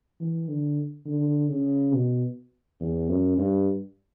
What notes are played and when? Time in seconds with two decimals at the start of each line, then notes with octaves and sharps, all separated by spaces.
0.20 E3
0.48 D3
1.06 D3
1.50 C#3
1.93 B2
2.80 E2
3.09 F#2
3.38 G2